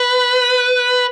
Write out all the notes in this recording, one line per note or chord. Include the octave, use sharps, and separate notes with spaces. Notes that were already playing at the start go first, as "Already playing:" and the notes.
Already playing: B4